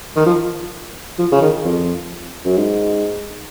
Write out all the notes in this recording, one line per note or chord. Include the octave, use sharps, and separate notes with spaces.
D#3
F3
F3
C#3
D#3
F2
F#2
G#2